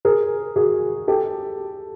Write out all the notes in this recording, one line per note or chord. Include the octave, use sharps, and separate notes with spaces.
G#4 A#4
F#4 G#4
G4 A4